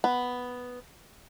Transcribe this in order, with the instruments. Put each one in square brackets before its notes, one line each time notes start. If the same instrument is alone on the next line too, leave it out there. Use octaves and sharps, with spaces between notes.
[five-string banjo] B3